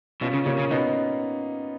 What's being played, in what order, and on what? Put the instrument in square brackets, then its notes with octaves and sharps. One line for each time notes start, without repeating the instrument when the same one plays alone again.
[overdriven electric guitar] B2 [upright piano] C#4 F4
[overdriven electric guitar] C#3
[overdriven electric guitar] C#3 [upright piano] A#3 C#4
[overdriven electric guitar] C#3
[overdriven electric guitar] B2 [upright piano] B3 D#4